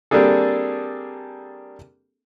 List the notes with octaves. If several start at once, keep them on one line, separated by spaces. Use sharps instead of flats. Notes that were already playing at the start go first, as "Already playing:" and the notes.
G3 A#3 C4 D4 G#4 A4